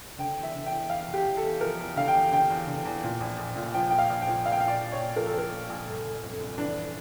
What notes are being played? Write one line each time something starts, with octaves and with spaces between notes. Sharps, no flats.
D3 G5
E2
E5
D3
G5
E2
E2 F5
E2
G4
E2
A4
E2
F3 A#4
E2
D3 F5
G5
E2
D3 G5
E2
D3
E2
A#2
A#1
A#1
A#2
F3 G5
A#2 G5
F5
A#1
G5
F3
A#2 F5
G5
F5
A#1 D5
A#1
C#5
A#2
F3 A#4
A4
F3 A#4
A#2
A#1
G1
G1
F2
G1
E3 D4